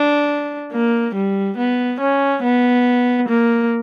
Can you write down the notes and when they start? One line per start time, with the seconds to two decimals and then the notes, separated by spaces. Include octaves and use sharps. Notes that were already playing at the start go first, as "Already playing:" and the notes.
Already playing: D4
0.72 A#3
1.14 G3
1.58 B3
2.00 C#4
2.43 B3
3.29 A#3